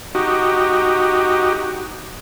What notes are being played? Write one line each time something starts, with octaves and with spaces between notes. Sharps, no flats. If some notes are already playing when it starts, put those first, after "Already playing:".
D#4 F#4 G4